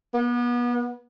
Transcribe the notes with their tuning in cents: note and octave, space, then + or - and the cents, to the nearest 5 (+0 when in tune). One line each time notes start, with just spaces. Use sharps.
B3 -30